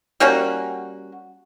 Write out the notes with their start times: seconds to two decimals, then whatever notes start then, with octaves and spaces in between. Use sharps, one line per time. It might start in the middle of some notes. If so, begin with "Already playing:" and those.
0.20 G3 A#3 C#4 F#4